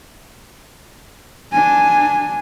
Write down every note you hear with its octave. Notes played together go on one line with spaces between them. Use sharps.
D4 G#5